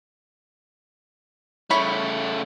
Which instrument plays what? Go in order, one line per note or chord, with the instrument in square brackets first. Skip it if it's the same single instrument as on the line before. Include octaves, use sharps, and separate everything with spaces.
[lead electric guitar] C#3 A3 [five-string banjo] E4 C#5 B5